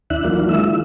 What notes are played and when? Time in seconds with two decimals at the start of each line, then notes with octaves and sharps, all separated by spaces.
0.10 D#2 D4 E4 E5 F#6
0.24 D#3 E3 F#3 A#3 D4 F4
0.49 D#3 G#3 E5 E6
0.67 E4 F4